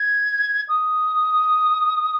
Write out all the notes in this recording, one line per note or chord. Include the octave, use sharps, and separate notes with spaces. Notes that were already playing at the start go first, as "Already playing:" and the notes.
Already playing: G#6
D#6